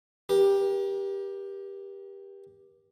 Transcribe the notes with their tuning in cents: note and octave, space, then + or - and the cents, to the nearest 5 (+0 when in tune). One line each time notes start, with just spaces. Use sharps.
G4 +10 A#4 +45